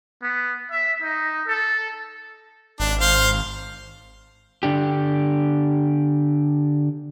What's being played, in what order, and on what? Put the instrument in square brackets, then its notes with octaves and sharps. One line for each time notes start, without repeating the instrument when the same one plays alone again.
[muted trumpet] B3
E5
D#4
A4
[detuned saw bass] G#1 [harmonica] D4
[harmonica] C5 F5
[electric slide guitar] D3 D4 G4